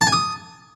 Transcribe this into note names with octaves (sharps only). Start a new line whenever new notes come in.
A5
G#5
D#6